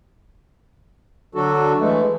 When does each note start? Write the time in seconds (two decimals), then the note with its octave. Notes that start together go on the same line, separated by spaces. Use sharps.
1.35 D3 F#3 D4 F#4 A4
1.79 E3 G#3 A3